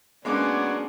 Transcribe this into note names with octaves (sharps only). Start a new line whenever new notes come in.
F#3 G#3 A#3 B3 C#4 D4 D5 D6